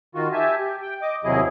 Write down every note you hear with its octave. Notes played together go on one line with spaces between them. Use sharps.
D#3 F4 F#4
G4 E5 G#5 A5
G4
G5
D#5 D6
D#2 C3 F#3 E4 G#4 D#5